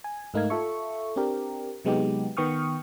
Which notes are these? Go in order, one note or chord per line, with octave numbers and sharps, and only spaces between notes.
G#5
G#2 A3 D#4 A#4 F5 G#6
F4 A4 E5 C#6
C4 D4 G4 A#4
C3 F#3 G#3 B3 D#4 G4
D#3 B3 G5 C#6 D#6 F6